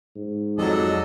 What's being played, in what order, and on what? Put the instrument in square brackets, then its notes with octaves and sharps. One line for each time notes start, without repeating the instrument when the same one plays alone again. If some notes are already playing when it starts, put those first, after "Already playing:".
[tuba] G#2
[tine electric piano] F2 F#3 [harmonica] D4 A4 D#5